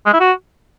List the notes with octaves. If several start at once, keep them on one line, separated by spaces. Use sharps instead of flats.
G#3
E4
F#4